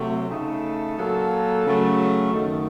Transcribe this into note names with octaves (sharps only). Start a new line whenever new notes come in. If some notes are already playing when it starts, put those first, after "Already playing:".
Already playing: C3 F#3 A3
C#3 A3 D#4 A4
A#2 F#3 A#3 F4 A4
C#3 F#3 A3
F#2 D#3 A3